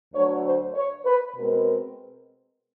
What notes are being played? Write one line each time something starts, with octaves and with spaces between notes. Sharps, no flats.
D2 D3 F#3 C#5
C5
C#5
B4
B2 G#3 C4 A#4